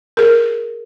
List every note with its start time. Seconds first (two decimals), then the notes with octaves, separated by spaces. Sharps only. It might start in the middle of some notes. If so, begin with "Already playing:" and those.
0.17 G#4 A#4